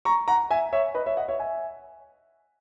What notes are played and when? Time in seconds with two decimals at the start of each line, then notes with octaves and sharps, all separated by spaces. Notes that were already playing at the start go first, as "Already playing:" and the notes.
0.05 A#5 C#6
0.28 F#5 A#5
0.51 E5 G#5
0.73 C#5 E5
0.95 B4 D#5
1.06 C#5 E5
1.17 D#5 F#5
1.28 C#5 E5
1.39 E5 G#5